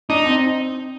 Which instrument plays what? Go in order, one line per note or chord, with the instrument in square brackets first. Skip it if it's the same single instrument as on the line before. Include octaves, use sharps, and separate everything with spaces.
[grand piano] D4 [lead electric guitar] D#4
[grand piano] C4